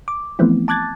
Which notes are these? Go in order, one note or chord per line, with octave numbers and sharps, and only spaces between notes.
D6
E3 F3 A3 B3 C4 E4
A5 D6 F#6 G#6 A6